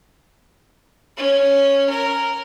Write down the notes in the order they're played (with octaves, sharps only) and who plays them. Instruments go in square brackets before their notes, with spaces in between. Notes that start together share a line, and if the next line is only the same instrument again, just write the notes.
[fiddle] C#4
A#4